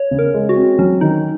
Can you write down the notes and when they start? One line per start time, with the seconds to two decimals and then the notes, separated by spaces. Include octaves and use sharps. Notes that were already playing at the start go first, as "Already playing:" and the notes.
Already playing: C#5
0.11 C#3
0.19 A#4
0.34 G#3
0.49 F#4
0.56 C4
0.79 F#3 C#4
1.01 D#3 D#4